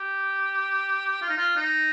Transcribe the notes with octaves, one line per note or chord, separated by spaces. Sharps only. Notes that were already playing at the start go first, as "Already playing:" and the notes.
Already playing: G4
F4
D#4
F4
D#4